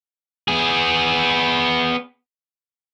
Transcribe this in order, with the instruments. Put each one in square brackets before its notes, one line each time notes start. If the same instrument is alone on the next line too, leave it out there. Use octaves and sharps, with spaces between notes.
[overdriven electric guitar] B3 G#4